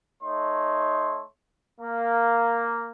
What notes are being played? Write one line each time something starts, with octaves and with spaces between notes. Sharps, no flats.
A3 D#4 C#5 C6
A#3